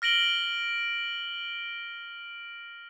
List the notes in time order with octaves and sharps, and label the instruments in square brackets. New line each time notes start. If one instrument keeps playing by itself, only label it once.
[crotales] F6 A#6 D7 F#7 G7